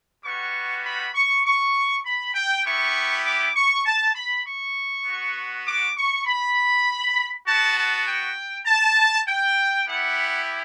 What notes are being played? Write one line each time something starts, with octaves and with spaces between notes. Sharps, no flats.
G3 B3 F#4 C#6
B5
C#6
C#6
B5
G5
B3 E4 G4 C#6
D6
C#6
A5
B5
C#6
B3 F#4
D6
C#6
B5
B3 F#4 A5
A5
G5
A5
G5
B3 E4 G4 F#5